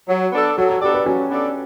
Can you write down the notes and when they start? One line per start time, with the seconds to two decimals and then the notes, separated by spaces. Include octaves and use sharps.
0.08 F#3
0.32 B3 D4 A4 D5
0.58 F#3 A4
0.70 F#4
0.81 B3 D4 G4 A4 D5
0.94 B4
1.06 F#3 C#4
1.30 B3 D4 A4 D5